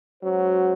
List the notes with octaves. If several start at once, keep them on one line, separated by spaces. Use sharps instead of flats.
F#3 G#3 C#4 F#4 C5